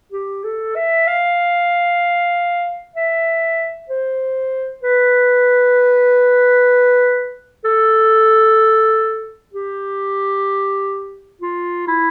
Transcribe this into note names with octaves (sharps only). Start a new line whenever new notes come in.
G4
A4
E5
F5
E5
C5
B4
A4
G4
F4
E4